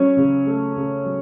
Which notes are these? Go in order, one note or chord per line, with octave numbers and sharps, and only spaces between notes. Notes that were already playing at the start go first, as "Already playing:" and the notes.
Already playing: F#3 C#4 C#5
C#3
A3
C#3
F#3